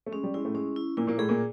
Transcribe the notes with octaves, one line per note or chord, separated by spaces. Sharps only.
A3
G#3 C#4
G3
G#3 E4
A2 A3
G#3 C#4
E4
A#2 A#3 E4
A#2 A#3
A2 A3 G#4
A#2 A#3